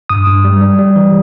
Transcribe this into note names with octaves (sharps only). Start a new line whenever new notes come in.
G2 D#6
G2
G3
G3
G3
E3